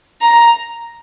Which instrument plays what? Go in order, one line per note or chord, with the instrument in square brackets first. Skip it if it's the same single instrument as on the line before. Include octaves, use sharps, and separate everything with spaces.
[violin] A#5